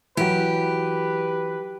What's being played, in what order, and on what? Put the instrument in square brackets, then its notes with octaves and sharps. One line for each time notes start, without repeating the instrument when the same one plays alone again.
[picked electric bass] E3 F#3 [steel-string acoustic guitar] G4 [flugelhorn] B4